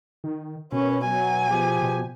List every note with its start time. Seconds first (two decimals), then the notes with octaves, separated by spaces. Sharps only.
0.24 D#3
0.72 B2 C#4 A#4 B4 C#5
1.05 F#3 G#5
1.49 F3 G4 G#4
1.82 B2